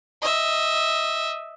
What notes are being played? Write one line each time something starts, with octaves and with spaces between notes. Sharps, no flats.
D#5 E5